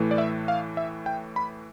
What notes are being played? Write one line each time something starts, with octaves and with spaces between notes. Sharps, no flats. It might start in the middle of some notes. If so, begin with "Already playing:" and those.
Already playing: A2 E3 A3
D5
E5
F5
E5
G5
B5